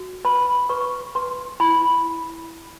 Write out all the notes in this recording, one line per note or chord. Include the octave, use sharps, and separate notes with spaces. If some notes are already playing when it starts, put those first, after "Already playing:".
Already playing: F#4
B4 B5
B4 C#6
B4 C6
E4 B5